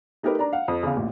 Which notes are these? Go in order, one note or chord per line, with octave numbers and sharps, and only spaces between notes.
A3 D#4 G4 A#4 B4
D4 A#5
F5 F#5
F2
E2 C#3 F5
A1 A#2